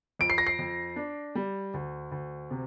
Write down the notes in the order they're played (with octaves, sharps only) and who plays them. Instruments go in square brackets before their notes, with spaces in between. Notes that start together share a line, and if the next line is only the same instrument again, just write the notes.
[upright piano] F2 [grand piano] D7
[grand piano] C7
A#6
C7
[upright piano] F2
D4
G3
D2
D2
C3